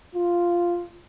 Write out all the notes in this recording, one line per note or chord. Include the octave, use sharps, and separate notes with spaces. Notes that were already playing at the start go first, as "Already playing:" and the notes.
F4